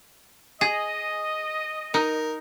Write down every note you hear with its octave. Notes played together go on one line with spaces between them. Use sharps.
G#4 D#5
D#4 A#4